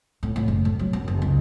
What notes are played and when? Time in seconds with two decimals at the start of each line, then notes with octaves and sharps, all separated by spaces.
0.23 A2
0.36 A2
0.48 F#1
0.65 A2
0.79 F#3
0.93 F#2
1.08 F#1
1.22 C#2